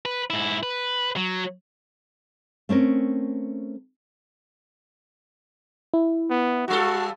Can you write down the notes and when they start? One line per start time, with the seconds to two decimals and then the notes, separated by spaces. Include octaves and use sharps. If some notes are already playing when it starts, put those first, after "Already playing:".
0.05 B4
0.30 G#2 E4
0.63 B4
1.16 F#3
2.69 A3 C4 C#4 A#4
5.94 E4
6.30 B3
6.68 G2 G3 F#4 A4